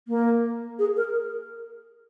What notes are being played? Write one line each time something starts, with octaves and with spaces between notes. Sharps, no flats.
A#3
G#4
A#4